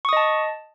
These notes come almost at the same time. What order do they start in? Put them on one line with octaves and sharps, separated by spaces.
C#6 D#6 D#5 A5